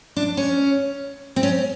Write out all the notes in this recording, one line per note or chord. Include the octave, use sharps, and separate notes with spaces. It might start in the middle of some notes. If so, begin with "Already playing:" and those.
D4
C#4
C4
C#4